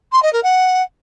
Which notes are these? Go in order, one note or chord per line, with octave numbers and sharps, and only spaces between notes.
C6
D#5
A#4
F#5